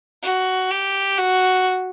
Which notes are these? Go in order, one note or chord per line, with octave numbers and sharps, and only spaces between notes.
F#4
G4
F#4